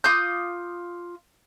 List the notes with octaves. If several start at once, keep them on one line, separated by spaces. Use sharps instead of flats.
F4 D6 D#6 G6